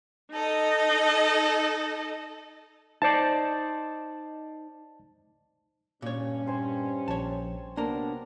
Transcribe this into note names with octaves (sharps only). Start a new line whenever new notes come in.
D#4 A4 D#5
D#4 C5 D5 A5
G2 A#2 C#4 C#5
C4 C5 G#5
A#1 C#5 A5
C3 F#3 A#3 B3 D4 A#4